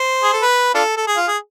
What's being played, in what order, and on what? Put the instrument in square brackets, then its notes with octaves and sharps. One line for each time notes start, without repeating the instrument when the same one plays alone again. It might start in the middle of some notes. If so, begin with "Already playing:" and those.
Already playing: [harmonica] C5
G#4
A4
B4
D4 F4 A4
A4
G#4
F4
G#4